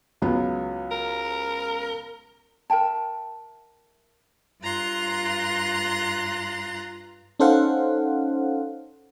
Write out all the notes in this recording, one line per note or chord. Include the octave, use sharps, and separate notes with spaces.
C#2 F#3 B3
A#4
A#4 E5 G5 A5
G2 F4 A#5 C6 F#6
C#4 D#4 A4 C5 F5 F#5